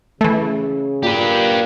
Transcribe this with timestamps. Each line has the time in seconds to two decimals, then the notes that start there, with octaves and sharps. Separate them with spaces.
0.21 C#3 E3 A3
1.03 A#2 G4 B4